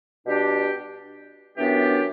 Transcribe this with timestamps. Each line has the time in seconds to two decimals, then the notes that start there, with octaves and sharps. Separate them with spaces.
0.25 B2 G3 D4 G4
1.56 F#2 E3 B3 D4 G4